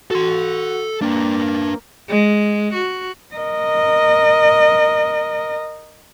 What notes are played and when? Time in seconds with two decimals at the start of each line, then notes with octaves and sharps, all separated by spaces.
0.11 F#4 A4 C6
1.02 A#3 D4 B4
2.09 G#3
2.74 F#4
3.35 A#4 D#5